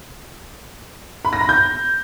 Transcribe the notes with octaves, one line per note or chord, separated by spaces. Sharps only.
B5
A#6
B5
G6